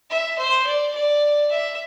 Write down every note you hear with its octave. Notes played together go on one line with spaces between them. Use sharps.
E5
C5
D5
D5
E5